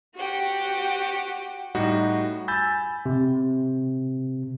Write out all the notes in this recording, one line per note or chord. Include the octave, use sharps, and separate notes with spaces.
F#4 G4 F#5
A2 G3 D#4 F#4
G#5 B5 E6 G6 A6
C3